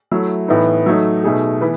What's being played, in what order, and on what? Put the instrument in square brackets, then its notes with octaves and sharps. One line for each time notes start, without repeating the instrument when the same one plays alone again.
[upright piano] F#3 A3 E4
A2 E3 B3 D#4
F#3 A3 D#4
B2 A3 D#4 G#4
E3 B3 B4